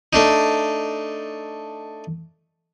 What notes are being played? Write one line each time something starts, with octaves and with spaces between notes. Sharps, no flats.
A3 D4 D#4